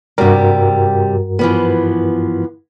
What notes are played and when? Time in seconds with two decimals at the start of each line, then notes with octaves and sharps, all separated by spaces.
0.18 G2 C3 G3 F#4 A#4
1.39 E3 F3 B3